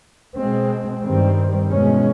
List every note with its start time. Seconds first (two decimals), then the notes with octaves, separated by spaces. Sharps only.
0.36 B2 G#3 C4
1.03 G2 D#3 G3 C4
1.70 E2 B2 G#3 C#4